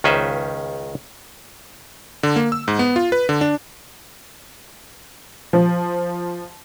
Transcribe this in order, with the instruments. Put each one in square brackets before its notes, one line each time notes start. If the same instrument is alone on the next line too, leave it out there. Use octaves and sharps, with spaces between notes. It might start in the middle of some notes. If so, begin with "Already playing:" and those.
[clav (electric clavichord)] C#2 D#3 C#4 B4 C5 E5
[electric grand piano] D3
A#3
E6
G#2
B3
F4
B4
D3
D4
[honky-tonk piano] F3